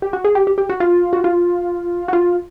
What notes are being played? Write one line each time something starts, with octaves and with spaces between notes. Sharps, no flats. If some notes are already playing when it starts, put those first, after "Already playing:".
G4
F#4
G#4
G4
G4
G4
F#4
F4
F#4
F4
F#4
F4